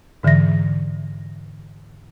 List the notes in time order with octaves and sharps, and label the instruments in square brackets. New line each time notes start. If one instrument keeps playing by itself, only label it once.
[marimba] G#2 D3 E3 E5 A#6